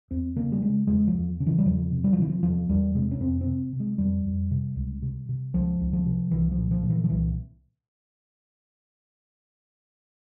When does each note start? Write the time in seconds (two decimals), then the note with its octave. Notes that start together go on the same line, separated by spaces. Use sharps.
0.11 E2 C4
0.36 C#3 A#3
0.52 G3
0.62 C#3 G#3
0.87 E2 G#3
1.08 F3
1.13 E2
1.40 C#3
1.46 E3
1.59 G3
1.65 E2 F3
1.91 C3
2.04 G3
2.13 F3
2.18 C3 E3
2.30 F3
2.43 E2 F3
2.69 E2 G3
2.95 C3 G#3
3.11 C#4
3.20 F2 C4
3.41 C4
3.47 C3
3.73 C3
3.80 G#3
3.98 F2 G3
4.25 F2
4.51 C3
4.76 C#2
5.02 C3
5.29 C3
5.54 C#2 F3
5.80 C#2
5.93 F3
6.06 C3
6.31 C2 E3
6.52 F3
6.58 A#2
6.71 F3
6.83 A#2
6.90 E3
7.04 F3
7.10 C2 E3